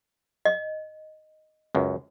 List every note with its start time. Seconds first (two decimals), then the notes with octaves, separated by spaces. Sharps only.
0.45 D#5
1.75 C#2 F#2